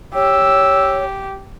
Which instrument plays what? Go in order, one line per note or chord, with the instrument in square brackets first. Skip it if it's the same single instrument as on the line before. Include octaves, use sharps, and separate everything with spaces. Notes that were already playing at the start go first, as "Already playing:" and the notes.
[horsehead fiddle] G4 [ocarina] C#5 [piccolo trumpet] E6